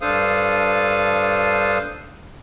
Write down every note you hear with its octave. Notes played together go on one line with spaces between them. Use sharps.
G2 D4 A4 C5 F5 D#6